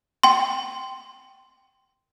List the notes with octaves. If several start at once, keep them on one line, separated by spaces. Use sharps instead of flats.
G5 C6